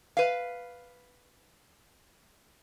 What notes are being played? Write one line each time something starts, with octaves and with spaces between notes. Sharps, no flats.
B4 F5